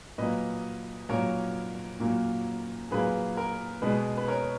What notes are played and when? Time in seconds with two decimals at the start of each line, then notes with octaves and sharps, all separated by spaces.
0.18 A#2 F#3 A#3 B4 D#5
1.09 A#2 F#3 A#3 A#4 C#5
2.00 A#2 F#3 A#3
2.91 A#2 F#3 A#3 G#4 B4
3.37 A#4
3.82 B2 G#3 B3 G#4 B4
4.17 B4
4.28 A#4 C#5